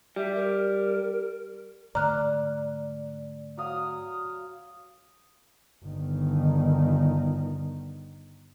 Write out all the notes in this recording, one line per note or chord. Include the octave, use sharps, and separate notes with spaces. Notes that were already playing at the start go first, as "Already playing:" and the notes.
G3 E5
A#4
G#2 D3 A3 D5 A#5 F6 F#6
F#3 F5 D#6
G1 D#3